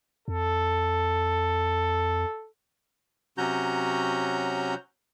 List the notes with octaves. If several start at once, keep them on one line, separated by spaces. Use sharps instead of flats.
F2 A4
C3 F#3 C#4 F#4 A#5 G6